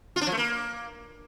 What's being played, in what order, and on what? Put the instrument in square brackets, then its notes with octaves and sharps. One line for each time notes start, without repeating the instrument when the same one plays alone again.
[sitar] F4
D4
F3
A3
A#3